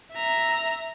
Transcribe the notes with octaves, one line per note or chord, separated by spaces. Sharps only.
E5 A#5